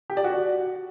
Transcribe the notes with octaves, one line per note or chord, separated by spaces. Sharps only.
G4
D5
F#4